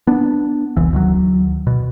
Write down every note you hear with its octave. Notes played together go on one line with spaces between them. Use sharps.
B3 D4
E1 C2 E3
D2 D#3 F#3
B2